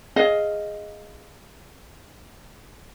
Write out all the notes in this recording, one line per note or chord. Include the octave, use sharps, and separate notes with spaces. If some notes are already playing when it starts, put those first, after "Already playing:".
G#4 D#5 F5